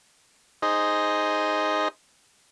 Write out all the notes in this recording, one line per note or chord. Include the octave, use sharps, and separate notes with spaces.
D#4 G#4 C5 D#5